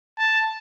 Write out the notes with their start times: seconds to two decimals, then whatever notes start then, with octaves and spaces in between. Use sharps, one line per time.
0.18 A5